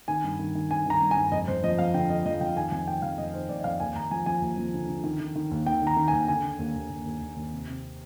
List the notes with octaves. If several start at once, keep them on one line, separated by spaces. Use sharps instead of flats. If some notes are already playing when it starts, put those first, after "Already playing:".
D#3 G#5
G2
D#3
D#3
G2 G#5
D#3 A#5
G2
G#5
G2
F2 D#5
F2 C5
F3 D#5
F2 F5
D3 G5
F2 D#5
F3 D#5
F2 G5
D#3 G#5
F2 G#5
D#3 G5
F2 F5
F2 D#5
D#3 C5
F2 D5
D#5
F2 F5
D#2 G#5
D#2 A#5
F3 G#5
F3 G#5
D#2
F3
D3
D3
D#3
D#3
D#3
D#2
D#3 G5
D#3 A#5
D#3
G#5
D#2
D3 G#5
D3
D#2
D#2
D#2
D#2
D#2
D#2
C3
C3